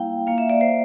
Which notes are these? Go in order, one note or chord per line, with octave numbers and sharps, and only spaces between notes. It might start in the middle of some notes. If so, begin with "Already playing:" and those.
Already playing: G3 A#3 E4 F5 G5
A#3 F4 F5
E5
D5
C5